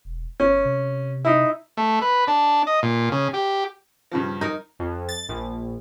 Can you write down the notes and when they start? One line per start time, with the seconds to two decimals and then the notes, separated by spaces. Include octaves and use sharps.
0.05 E1
0.40 G1 C#4
0.65 C3
1.25 D#4 E4
1.77 A3
2.02 B4
2.28 D4
2.67 D#5
2.83 A#2
3.12 C#3
3.34 G4
4.11 G2 C#3 F3
4.41 D#4 A#4
4.79 F2
5.09 A6
5.29 A#1